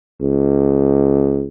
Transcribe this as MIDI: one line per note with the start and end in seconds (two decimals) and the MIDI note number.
0.21 1.48 37